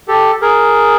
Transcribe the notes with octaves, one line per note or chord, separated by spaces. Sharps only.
G4 A4
G#4 A#4